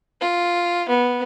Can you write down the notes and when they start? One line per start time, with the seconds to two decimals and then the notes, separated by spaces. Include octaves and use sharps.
0.21 F4
0.89 B3